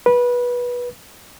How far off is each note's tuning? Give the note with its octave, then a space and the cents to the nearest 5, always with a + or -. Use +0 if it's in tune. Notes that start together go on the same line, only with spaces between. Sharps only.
B4 -20